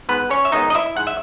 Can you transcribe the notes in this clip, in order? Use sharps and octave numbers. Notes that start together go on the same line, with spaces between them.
G#2 B3 B4
C#4 C#5
E5
D#3 G#3 B3 D#4 D#5
D#5
E4 E5
G#2 F#5
E5